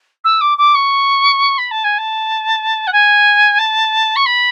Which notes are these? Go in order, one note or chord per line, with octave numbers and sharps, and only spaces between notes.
E6
D6
D6
C#6
B5
A5
G#5
A5
F#5
G#5
A5
C#6
B5